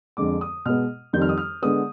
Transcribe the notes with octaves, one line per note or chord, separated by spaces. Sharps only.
F2 D3 G#3 D6
D#6
B2 G#3 B3 F6
F2 D#3 G3 G6
F6
D#6
F6
D3 G#3 B3 D#6